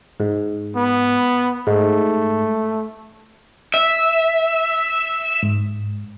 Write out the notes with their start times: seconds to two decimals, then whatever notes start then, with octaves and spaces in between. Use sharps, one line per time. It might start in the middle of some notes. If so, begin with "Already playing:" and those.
0.20 G#2
0.76 B3
1.67 G#2 A3
3.74 E5
5.43 G#2